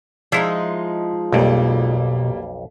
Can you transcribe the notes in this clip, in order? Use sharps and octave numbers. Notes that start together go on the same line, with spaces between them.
F3 G#3 D#4 E4
B1 F2 B2 G3 A#3